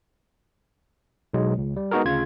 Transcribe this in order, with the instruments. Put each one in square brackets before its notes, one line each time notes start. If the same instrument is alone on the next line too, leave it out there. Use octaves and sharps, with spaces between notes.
[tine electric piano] B1 B2 F#3 G#3
C#2
G3
G#3 B3 D#4 F#4 G#4 A#4
D2 C#3 F4 G#6